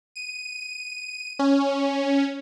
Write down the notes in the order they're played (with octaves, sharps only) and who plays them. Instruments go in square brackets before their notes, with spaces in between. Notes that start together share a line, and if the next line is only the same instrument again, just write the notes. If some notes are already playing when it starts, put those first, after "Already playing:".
[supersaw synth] D#7
C#4